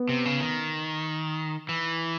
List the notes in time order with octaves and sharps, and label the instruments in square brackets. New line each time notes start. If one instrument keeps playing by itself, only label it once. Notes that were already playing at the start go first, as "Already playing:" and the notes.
Already playing: [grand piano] B3
[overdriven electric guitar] C3
C#3
D#3
E3